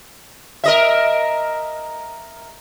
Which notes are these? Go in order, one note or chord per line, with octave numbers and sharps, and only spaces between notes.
A#4 D#5 E5